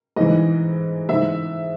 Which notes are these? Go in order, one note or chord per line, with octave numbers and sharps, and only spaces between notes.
G#2 E3 D#5
G#2 E3 E5